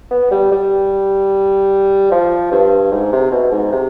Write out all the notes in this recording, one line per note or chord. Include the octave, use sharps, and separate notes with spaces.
B3
G3
G3
F3
G2
G#2
C3
B2
G#2
C3